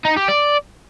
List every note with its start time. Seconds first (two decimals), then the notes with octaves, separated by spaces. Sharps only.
0.05 D#4
0.17 G4
0.29 D5